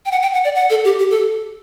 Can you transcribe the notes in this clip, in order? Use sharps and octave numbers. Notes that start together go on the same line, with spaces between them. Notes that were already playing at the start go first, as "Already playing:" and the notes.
G5
F#5
G5
F#5
D5
F#5
A4
G4
G4
A4